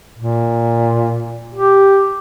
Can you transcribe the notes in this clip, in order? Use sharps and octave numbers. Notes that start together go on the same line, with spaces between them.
A#2
G4